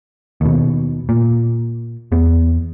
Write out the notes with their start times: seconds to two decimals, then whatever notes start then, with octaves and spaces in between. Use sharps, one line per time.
0.41 D#2 B2
1.09 A#2
2.12 E2 B3